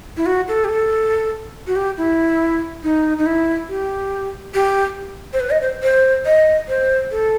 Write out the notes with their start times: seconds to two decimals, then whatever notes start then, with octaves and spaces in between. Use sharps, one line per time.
0.17 E4
0.26 F#4
0.48 A4
0.65 G4
0.69 A4
1.67 F#4
1.76 G4
1.98 E4
2.83 D#4
3.18 D#4
3.26 E4
3.69 G4
4.54 G4
5.33 C5
5.40 B4
5.50 D#5
5.62 C5
5.83 C5
6.26 D#5
6.68 C5
7.11 A4